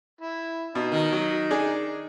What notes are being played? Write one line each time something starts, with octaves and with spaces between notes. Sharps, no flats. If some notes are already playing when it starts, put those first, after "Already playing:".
E4
B2 D#4
D#3
F#3
D4 G#4